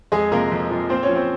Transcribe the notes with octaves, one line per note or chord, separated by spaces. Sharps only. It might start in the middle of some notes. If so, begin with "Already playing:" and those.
F2 G#3 G#4
C3 F3 A#3 A#4
F2
C3 F3
A#2 C4 C5
C#4 C#5
F3
C4 C5